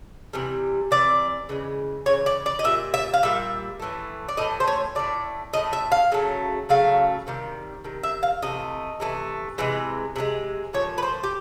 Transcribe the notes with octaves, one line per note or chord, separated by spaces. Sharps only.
C3 E3 G3
C3 E3 D5
C#3 E3 G#3
C#3 E3 C#5
D5
D5
D#5
A#2 G3 E5
E5
F5
A#2 G3 E5
A2 E3 A3
D5
A2 E3 A3 D#5
C5
C#5
A2 F#3 A3 D5
A2 F#3 A3 D#5
E5
F5
C#3 F#3 A3
C#3 F#3 A3 F5
C3 D#3 G3
C3 D#3
E5
F5
C3 E3 A3 D#5
C3 E3 A3
C3 E3 G#3
C3 E3 G#3
A#2 F3 A3 C#5
B4
C5
G4